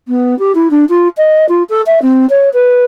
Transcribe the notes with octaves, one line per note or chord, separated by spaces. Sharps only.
B3
G4
E4
D4
F4
D#5
F4
A4
E5
C4
C#5
B4